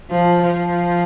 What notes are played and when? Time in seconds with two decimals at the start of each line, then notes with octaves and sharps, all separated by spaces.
0.10 F3
0.43 F3